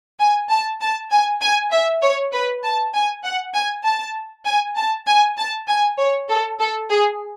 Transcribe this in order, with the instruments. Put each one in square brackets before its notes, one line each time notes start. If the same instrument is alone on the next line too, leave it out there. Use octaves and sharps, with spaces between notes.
[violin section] G#5
A5
A5
G#5
G#5
E5
C#5
B4
A5
G#5
F#5
G#5
A5
G#5
A5
G#5
A5
G#5
C#5
A4
A4
G#4